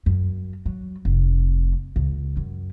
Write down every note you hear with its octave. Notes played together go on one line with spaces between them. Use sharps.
F#2
F#3
F1
C#2
F#2